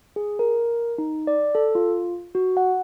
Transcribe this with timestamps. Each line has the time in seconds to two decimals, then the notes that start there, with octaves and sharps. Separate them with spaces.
0.16 G#4
0.39 A#4
0.98 D#4
1.27 D5
1.55 A4
1.75 F4
2.35 F#4
2.57 F#5